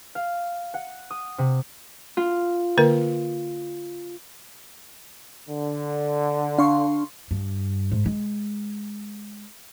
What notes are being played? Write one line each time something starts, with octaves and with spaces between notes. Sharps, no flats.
F5
F#5
D#6
C3
F4
D3 A#3 A#4
D3
D4 F5 C6 C#6
G2
G#2
G#3